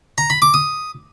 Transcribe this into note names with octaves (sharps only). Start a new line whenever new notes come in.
A#5
B5
D6
D#6